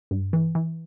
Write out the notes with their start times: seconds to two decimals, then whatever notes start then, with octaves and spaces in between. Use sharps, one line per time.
0.11 G2
0.33 E3
0.55 E3